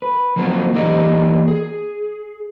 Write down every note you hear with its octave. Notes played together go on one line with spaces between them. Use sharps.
B4
F3 F#3 A#3 C4 F4 F#4
E3 A#3 D#4 G4 D5 D#5
G#4